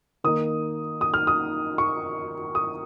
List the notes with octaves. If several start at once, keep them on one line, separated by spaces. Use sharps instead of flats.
D#3 A#3 D#4 D#6
D#6
F6
D#6
C#6
D#6